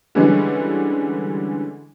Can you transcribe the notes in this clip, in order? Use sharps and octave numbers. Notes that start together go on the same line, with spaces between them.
D3 E3 G3 G#3 C#4 D4